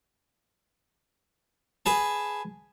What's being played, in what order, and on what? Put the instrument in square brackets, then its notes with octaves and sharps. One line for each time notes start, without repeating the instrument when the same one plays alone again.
[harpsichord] G#4 B4 A5